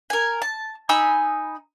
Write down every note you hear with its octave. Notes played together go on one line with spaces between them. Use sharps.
A#4 G#5
A5
D#4 G#5 B5 E6